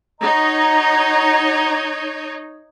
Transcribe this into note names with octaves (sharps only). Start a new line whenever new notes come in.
D#4 F#4 C#5 D#5 A#5